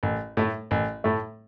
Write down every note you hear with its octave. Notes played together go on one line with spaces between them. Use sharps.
A1
A2 A3
A1
A2 A3